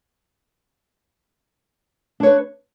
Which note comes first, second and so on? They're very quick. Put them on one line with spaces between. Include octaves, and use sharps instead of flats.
D4 C#5 B4